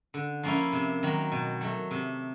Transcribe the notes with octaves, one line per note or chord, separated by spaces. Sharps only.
D3
F3 A#3 C#4 E4
C3
D#3 F#3 A#3
B2
F#3 A3
C3